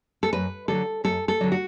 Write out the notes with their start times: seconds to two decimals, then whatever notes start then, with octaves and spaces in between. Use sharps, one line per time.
0.23 A4
0.33 F#2 B4
0.68 D3 F#3 A4
1.04 F#2 A4
1.28 A4
1.41 D3 F#3
1.52 F#4